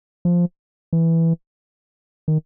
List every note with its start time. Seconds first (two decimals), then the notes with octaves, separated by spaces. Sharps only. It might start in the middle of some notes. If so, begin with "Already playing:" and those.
0.25 F3
0.93 E3
2.28 D#3